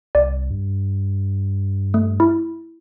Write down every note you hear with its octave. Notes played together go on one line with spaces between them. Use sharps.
C2 D5
G2
A3
E4